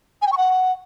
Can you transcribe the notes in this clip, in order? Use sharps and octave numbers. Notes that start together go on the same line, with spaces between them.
G#5
G5
C#6
F#5